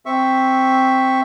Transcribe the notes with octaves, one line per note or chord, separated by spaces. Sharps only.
C4 E5 C#6